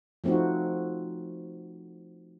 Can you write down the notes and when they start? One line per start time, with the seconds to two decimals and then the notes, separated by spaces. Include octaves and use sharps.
0.24 F3 A3 C4 D#4 F#4